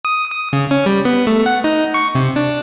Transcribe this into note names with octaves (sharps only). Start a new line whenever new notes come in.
D#6
D#6
C#3
C#4
G3
B3
A3
F#5
D#4
C#6
C3
D4